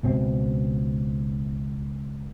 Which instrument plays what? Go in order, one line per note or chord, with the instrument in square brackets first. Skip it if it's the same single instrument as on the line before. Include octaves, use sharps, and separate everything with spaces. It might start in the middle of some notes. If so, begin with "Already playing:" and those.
[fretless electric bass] C#2 B2 C4